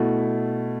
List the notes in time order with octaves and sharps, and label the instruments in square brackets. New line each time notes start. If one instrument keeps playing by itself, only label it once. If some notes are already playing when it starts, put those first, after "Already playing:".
Already playing: [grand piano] B2 A3 E4